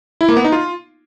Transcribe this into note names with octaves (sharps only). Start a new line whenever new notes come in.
E4
A#3
B3
D#4
F4